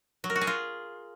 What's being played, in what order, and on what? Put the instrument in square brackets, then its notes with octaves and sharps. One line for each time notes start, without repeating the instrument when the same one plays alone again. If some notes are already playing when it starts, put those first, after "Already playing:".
[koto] F#3
A#4
F#4
G#4
F4